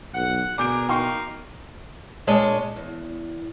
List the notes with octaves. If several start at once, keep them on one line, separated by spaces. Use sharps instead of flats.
B1 F#5
B2 D4 G#4 A#4 D6 G6 D7
A#3 D#4 G5 C6 C#6
A#2 G#3 D4 C#5 D#5 A5
E2